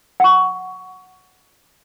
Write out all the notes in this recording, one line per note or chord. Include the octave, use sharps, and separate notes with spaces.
F#5 C#6